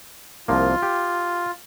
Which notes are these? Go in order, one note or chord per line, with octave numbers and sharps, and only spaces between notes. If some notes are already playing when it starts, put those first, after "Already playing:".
C2 F3 A#3 F4
G4